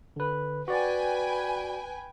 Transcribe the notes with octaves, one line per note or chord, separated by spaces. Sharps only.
D3 B4
F#4 B4 D5 G5 G#5